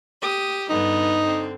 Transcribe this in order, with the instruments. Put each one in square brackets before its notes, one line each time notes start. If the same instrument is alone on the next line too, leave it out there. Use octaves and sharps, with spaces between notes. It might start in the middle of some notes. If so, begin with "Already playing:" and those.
[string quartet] G4 D#6
[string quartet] G2 D3 B3 [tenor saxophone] D#4
[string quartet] D3 C4